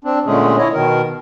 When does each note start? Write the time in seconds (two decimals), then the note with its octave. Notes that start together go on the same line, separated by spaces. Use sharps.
0.04 C4 D4
0.26 A#2 D3 G#3 A3 C#4 G#4
0.58 E4 C#5 D#5
0.73 B2 D#3 A#4